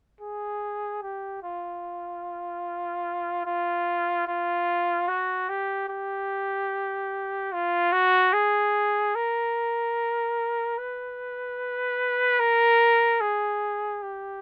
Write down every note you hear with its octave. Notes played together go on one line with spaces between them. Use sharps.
G#4
G4
F4
F4
F4
F#4
G4
G4
F4
F#4
G#4
A#4
B4
A#4
G#4
G4